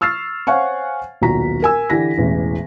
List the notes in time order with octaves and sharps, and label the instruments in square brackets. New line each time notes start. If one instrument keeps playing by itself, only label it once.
[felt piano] C#6 E6 F6 A6 C7
C5 C#5 F5 F#5 G#5 C#6
D#1 B1 A#2 F#4 A#5 B6
A#4 G#5 E6
D3 E3 G4 G#5 A#6 B6
E1 A1 E3